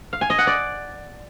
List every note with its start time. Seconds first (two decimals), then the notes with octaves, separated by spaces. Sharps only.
0.13 F5
0.21 G#5
0.30 D#5
0.38 F#5
0.47 D5